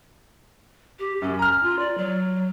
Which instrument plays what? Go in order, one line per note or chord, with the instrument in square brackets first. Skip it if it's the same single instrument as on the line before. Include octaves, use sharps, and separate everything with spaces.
[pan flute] G4
[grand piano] F#2 [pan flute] C#4
[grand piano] A#5 F6
[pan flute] F4
D5
F#3